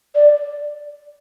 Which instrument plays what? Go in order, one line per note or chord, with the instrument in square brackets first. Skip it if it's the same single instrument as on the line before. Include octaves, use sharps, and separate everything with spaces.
[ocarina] D5